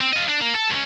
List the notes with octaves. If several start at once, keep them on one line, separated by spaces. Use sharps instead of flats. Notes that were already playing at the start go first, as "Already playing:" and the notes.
C4
F4 D#5
D4
A#3
A4
C#2 C#4